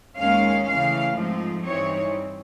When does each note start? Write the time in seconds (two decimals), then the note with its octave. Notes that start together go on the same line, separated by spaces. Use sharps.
0.18 D#2 D#3 G#3 C#4 F5
0.66 C#3 E3 A3 F5
1.15 G#2 F3 A3 C4 D#4
1.64 G2 E3 G3 C4 D#4 C#5